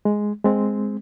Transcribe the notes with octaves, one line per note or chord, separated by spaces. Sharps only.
G#3
G#3 C4